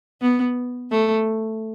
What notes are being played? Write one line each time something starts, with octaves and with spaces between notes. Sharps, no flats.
B3
A3